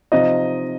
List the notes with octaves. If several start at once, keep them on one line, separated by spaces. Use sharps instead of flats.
C3 F3 C4 D#4 D#5